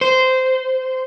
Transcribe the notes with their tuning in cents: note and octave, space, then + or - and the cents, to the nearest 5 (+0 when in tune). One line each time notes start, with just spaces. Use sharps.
C5 -15